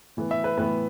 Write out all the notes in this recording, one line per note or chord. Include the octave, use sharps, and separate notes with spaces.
A2 E3 B3
E5
B4
A2 E3 B3 B4